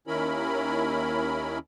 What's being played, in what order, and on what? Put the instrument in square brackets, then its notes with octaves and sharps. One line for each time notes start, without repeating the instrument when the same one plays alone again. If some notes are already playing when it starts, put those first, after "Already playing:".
[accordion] D#2 D#3 C#4 E4 A#4 B5